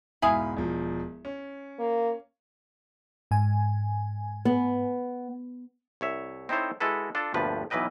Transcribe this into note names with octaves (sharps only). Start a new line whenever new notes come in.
E1 G#2 E4 G#4 F5 B5
E1 F3
C#4
A#3
G#2 G#5
B3
C2 C#5 E5
C4 D#4 E4 A4 C5 C#5
G#3 E4 F#4 A4 B4
D4 F4 A4
G1 D2 G2 A#2 F3 B4
B1 E3 F#3 B4 D#5 G5